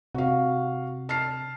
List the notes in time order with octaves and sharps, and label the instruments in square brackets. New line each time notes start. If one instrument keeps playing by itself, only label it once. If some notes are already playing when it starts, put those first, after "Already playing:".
[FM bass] C3 [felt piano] F#4 F5
[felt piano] A5 F6 C7